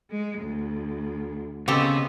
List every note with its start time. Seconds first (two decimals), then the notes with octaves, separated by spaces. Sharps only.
0.10 G#3
0.39 D2
1.68 C#3 B3 C4 G4 A4 D#5